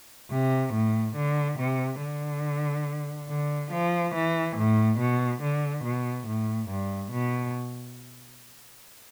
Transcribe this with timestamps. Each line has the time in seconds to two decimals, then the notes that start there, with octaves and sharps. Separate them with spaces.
0.31 C3
0.73 A2
1.16 D3
1.59 C3
2.01 D3
3.30 D3
3.72 F3
4.15 E3
4.57 A2
4.99 B2
5.42 D3
5.84 B2
6.27 A2
6.70 G2
7.12 B2